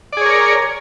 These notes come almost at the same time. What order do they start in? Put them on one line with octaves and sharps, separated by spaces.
D5 G#4 C#5 A#4